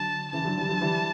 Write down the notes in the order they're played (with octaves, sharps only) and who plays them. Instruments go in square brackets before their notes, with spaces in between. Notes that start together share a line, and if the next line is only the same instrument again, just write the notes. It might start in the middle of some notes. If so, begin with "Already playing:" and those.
Already playing: [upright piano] D3 F#3 [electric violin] A5
[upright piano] C#3 E3 [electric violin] A5
[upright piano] D3 F#3
E3 G3
D3 F#3
E3 G3